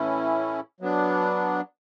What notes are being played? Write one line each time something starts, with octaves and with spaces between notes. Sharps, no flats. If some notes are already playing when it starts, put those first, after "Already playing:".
Already playing: A2 E3 A3 C#4 E4
F#3 B3 D4